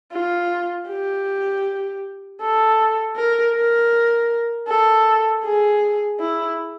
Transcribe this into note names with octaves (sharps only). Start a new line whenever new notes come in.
F4
G4
A4
A#4
A#4
A4
G#4
E4